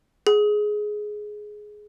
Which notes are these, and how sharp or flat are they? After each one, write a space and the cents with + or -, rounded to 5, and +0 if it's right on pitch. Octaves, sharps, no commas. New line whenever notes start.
G#4 +10